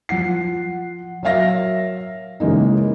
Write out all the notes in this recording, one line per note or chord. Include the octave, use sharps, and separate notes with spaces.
F3 F#5 C7
F#3 A#4 E5 F5 A#6
C#3 E3 G#3 A#3 D#4